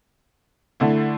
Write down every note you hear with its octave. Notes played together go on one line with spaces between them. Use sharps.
D3 A3 E4